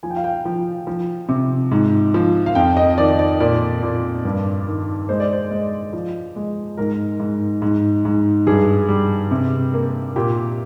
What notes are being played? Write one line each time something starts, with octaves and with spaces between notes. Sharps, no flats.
F3 G#5
G5
F5
G5
F3
F3
C3
G#2
F3
F5
F2 G5
D#5
D#3 D5
D5
A#2 D5
A#2
G2
D#3
G#3 C5
D5
C5
G#3
F3
G#3
G#2 A#4
G#2
G#2
G#2
G2 G#4
G3
C3
A#3
A#2 G4